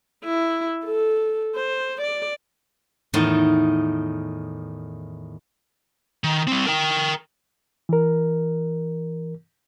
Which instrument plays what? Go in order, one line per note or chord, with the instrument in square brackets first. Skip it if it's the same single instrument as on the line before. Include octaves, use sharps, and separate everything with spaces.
[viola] E4
A4
C5
D5
[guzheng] E2 A2 D#3 D#4 A5
[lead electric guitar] D#3
G3 C4
A#4 G5
[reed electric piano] E3 A#4